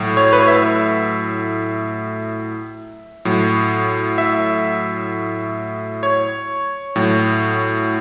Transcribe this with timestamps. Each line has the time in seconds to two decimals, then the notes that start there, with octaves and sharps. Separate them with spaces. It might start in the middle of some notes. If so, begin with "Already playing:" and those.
Already playing: A2 F#3
0.17 C#5
0.33 B4
0.40 C#5
0.48 E5
3.25 A2 F#3
4.18 E5
6.03 C#5
6.96 A2 F#3